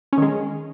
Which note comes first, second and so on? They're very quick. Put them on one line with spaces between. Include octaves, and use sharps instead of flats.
C#4 D#3 G#3